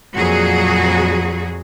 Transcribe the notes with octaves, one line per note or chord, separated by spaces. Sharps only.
F2 A#2 F#3 F#4 G#4